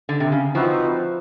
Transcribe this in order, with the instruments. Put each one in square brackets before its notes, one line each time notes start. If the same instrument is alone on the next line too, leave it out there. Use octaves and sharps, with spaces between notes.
[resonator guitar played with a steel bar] D3
C3
C#3
[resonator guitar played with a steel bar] F3 [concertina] C4 D#4 F#4 B4 E5